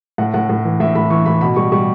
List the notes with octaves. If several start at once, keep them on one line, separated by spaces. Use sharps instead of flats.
A2 F#5
A2 F#5
A2
E3
A2 E5
A2 B5
E3 C#6
A2 B5
B2 B5
G3 C#6
G3 C#6